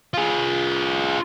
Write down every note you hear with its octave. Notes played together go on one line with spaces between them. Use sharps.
F4 G#4